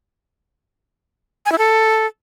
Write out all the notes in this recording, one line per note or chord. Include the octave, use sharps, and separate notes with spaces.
G#5
E4
A4